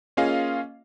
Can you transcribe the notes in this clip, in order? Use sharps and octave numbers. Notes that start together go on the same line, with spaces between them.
A#3 C#4 F4 G#4 D#5 F5